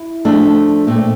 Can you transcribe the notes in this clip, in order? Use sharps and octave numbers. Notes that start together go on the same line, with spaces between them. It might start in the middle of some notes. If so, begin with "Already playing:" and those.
Already playing: E4
F3 A3 D4
A#2 A3 C4